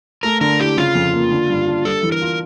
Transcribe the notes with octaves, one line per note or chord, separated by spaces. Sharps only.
A3 A#4
D3 A#4
E4 G4
C#3 F4
F2
A#3
D3
G2
D4
G3 A4
E3
A#4
F4